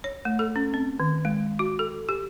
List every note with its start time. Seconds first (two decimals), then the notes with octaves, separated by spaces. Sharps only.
0.04 C#5
0.25 A3
0.39 A4
0.56 C#4
0.74 C4
1.00 D#3
1.25 G#3
1.59 F#4
1.79 A4
2.09 G4